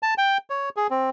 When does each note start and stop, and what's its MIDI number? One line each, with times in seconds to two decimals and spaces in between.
0.03 0.14 81
0.18 0.38 79
0.50 0.69 73
0.76 0.87 68
0.90 1.10 60